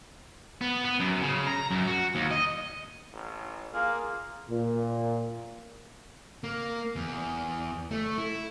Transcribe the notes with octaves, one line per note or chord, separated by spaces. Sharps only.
B3
B3
F#2
C#3
A#5
F#2
F#4
D#2
D#5
A1
A#3 F4 G#4 A#4
A#2
A#3
E2
A3
E4